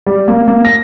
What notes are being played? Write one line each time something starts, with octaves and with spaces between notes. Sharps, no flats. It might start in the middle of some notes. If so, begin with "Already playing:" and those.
G3
A#3
A#3
A#6